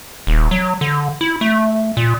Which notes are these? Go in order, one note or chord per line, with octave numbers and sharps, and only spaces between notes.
D#1
F#3
D3
E4
A3
A#2